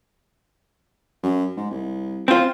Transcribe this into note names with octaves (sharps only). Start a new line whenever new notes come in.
F#2
G#2
C2
C4 F4